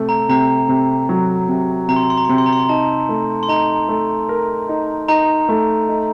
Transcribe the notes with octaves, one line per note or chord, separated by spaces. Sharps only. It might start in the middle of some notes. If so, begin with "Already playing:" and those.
Already playing: C3 A3
A#5
C3 A#5
C3
F#3
C3
C3 A#5
C6
A#5
C6
A#5
C6
C3 A#5
C6
A#5
C6
A#5
D#4 A5
A3
C6
D#4 A#5
A3
A#4
D#4
D#4 A#5
A3
D#4